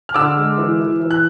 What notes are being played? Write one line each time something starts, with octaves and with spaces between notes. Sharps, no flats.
F6
D3 D6 E6
G#3
E3
E3
E3
F#6